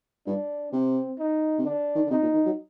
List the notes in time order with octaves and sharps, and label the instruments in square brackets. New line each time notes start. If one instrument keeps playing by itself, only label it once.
[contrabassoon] G2 [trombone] D4
[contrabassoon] C3 [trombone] C4
[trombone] D#4
[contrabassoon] C3
[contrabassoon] D3 [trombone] D4
[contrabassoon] D#3
D3
[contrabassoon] C3 [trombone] D#4
[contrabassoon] A#2
D#3
F#3